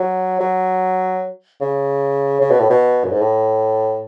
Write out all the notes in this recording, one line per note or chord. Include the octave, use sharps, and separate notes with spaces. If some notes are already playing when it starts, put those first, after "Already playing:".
Already playing: F#3
F#3
C#3
C#3
B2
A2
B2
F#2
G#2
A2